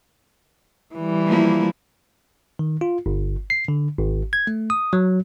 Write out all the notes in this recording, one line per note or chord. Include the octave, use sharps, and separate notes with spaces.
E3 G3
F3 A#3 E4
D#3
F4
G1
C7
D3
G#1
G#6
A3
D#6
F#3